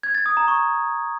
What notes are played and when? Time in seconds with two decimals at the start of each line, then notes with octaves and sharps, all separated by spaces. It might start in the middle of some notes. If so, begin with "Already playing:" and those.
0.03 G#6
0.15 A6
0.26 D#6
0.37 A#5
0.48 C#6